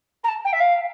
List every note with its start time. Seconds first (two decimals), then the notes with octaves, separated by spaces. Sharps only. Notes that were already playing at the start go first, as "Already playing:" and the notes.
0.23 A#5
0.28 A5
0.44 G5
0.52 E5
0.59 F5